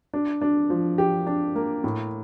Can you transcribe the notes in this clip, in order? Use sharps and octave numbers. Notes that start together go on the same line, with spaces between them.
D4
D4
F3
G4
D4
A#3
A2